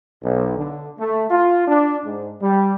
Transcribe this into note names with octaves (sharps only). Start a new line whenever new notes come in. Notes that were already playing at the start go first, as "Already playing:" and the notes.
B1
D3
A3
F4
D4
G#2
G3